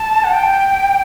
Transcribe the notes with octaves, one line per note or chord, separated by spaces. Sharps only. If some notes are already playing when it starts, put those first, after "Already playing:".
Already playing: A5
F#5
G5